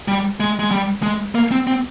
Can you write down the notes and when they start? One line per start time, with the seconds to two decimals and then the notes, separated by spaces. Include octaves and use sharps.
0.08 G3
0.40 G#3
0.60 G#3
0.71 G3
1.03 G#3
1.35 A#3
1.52 C4
1.67 C4